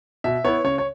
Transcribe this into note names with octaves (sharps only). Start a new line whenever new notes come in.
B2 E5
B3 E4 C#5
C#3 C#5
C#5